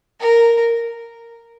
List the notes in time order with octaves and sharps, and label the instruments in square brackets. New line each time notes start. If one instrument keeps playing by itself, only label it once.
[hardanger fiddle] A#4